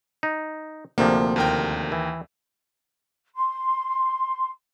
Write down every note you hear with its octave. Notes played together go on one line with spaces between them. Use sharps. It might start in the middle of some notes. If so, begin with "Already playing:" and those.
D#4
D2 C3 F3 A#3
D#2 A#4 G5
E3
C6